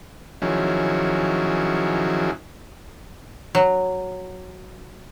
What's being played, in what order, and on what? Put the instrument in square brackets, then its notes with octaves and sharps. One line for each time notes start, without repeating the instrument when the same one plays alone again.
[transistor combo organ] D#3 F3 F#3 C#4 E4 G#4
[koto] F#3